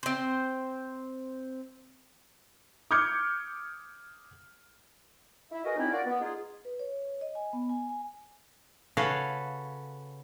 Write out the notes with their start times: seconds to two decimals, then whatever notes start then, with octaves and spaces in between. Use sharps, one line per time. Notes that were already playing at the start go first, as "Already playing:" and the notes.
0.03 C4 C5
2.91 D6 D#6 F6 G6 G#6 C#7
5.51 E4 E5
5.64 F#4 G#4 A#4 B4 D#5
5.76 F#3 G3 C4 C#4 D#4 E4
5.91 F4 F#4 A#4 D5
6.06 B3
6.20 D#4 F4 G#4
6.65 B4
6.79 C#5
7.21 D#5
7.35 G#5
7.53 B3
7.69 G#5
7.89 G#5
8.97 C#3 F#4 A4 B4 C#5 F5